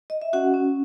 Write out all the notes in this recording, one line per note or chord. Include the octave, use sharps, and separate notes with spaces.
D#5
E5
C#4 F#4 F#5
C#4